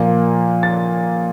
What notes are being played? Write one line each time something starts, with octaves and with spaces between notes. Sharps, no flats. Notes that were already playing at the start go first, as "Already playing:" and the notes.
Already playing: A#2 F3 A#3
A6